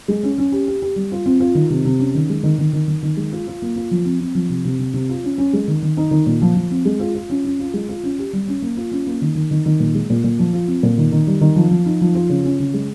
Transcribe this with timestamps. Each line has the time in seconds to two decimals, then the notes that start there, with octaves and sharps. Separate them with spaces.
0.08 G#3
0.23 C#4
0.38 C#4
0.52 G4
0.67 G4
0.82 G4
0.96 G3
1.12 F4
1.26 C4
1.40 F4
1.55 D#3
1.70 C3
1.85 C3
2.00 C#4
2.14 D#3
2.29 G#3
2.43 D#3
2.59 D#3
2.73 D#3
2.88 D#3
3.03 D#3
3.17 G#3
3.32 F4
3.47 F4
3.62 A#3
3.76 F4
3.91 F3
4.05 C4
4.20 C4
4.35 F3
4.50 C3
4.65 C3
4.79 C3
4.94 C3
5.09 F4
5.24 C#4
5.38 C#4
5.53 G#3
5.68 D#3
5.82 D#3
5.97 D#4
6.11 D#3
6.26 A#2
6.42 F3
6.55 F3
6.71 C4
6.85 G#3
7.00 F4
7.15 F4
7.30 C#4
7.45 C#4
7.59 F4
7.74 G#3
7.89 F4
8.03 C#4
8.18 G4
8.33 G3
8.48 C#4
8.62 A#3
8.77 F4
8.92 C#4
9.07 A#3
9.22 D#3
9.35 D#3
9.51 D#3
9.66 D#3
9.80 A#2
9.95 G#3
10.10 A#2
10.24 A#2
10.39 F3
10.53 F4
10.68 C4
10.83 A#2
10.98 D#3
11.12 D#3
11.27 G3
11.41 D#3
11.56 F3
11.71 F3
11.86 D#4
12.01 F3
12.15 F4
12.30 C#3
12.45 C#4
12.59 C#3
12.74 G#3